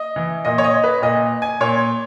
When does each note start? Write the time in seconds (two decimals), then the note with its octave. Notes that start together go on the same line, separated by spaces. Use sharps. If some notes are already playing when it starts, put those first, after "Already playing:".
Already playing: D#5
0.16 E3
0.45 A#2 D#5
0.58 C#5
0.64 D#5
0.84 B4
1.02 A#2 D#5
1.42 G#5
1.60 A#2 C#5